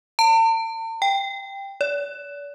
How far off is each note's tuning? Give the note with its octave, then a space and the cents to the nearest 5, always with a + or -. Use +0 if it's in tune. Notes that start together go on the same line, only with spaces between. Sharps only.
A5 +45
G5 +10
D5 -40